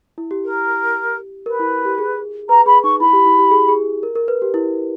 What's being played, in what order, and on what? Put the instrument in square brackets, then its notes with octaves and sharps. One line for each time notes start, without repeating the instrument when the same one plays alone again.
[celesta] E4
G4
[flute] A#4
[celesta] A#4 [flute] B4
[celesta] E4
G4
G#4
[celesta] B4 [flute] A#5
[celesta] G#4 [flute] B5
[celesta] D#4 [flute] C#6
[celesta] E4 [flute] B5
[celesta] G4
E4
G4
G#4
G#4
A#4
A#4
B4
G4
E4